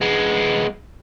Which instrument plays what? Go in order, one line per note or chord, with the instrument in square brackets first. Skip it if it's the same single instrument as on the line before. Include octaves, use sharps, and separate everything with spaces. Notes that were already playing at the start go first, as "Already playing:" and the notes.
[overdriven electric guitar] G#3 B3